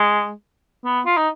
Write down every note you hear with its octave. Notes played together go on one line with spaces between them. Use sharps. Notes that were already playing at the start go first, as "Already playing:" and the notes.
Already playing: G#3
B3
F4
D#4